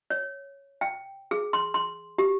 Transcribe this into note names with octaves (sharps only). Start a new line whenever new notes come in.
C#5
G5
G#4
C6
C6
G4